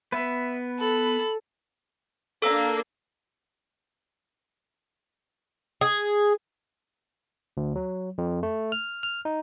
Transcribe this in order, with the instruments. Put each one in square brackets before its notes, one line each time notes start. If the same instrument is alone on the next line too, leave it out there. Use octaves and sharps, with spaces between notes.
[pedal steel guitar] B3 B4 [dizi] E5
[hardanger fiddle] A4 [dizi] B5
[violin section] A#3 D4 [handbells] A4 E6
[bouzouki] G#4
[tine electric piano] D2
F#3
F2
A3
F6
F6
D#4